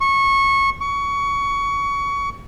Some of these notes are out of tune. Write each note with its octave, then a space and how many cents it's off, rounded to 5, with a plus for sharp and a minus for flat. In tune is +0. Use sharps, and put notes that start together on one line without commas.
C#6 -20
C#6 +20